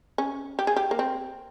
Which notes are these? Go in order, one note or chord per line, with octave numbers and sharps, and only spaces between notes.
C#4
G4
G#4
G4
A#3
C4